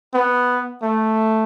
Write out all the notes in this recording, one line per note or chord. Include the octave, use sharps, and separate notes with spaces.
B3
A3